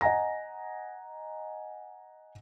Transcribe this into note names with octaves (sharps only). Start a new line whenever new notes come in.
D#5 F#5 G#5 A#5 A#6